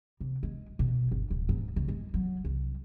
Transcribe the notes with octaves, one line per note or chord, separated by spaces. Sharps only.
C3
G#3
B2
G1
D1
G#2
C#2
G#3
F#3
C2